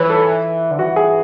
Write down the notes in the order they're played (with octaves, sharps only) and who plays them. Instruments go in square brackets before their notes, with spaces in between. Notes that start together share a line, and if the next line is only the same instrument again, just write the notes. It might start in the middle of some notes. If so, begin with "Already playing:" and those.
Already playing: [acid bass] E3 [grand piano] B4 C#5
[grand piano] A4
[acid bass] D3
[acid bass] E3 [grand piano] F#4
[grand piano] G#4